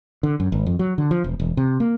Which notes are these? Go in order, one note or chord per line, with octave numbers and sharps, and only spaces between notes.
D3
F#2
G#1
F2
F#3
D3
F3
E1
E1
C3
A#3